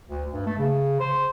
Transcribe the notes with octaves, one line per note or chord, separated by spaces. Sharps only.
D2
G2
A3
C#3
C5